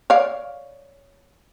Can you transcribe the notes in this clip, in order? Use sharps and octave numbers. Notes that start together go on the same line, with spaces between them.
C#5 D5 F5